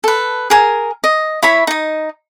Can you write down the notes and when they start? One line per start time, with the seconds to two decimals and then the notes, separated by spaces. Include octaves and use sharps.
0.04 A4 B4
0.50 G#4 A#4 G#5
1.04 D#5
1.43 E4 C#5 E5 B5
1.67 D#4 D#5